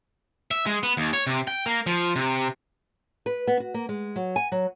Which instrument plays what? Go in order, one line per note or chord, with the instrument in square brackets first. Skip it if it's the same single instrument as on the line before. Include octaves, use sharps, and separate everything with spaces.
[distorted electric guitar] E5
G#3
B3
D#2
C#5
C3
G5
A#3
F3
C3
[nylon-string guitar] B4
B3
F#4
A#3
G#3
F#3
G#5
F#3